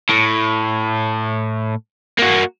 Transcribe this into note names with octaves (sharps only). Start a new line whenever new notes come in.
A2
A#3 F#4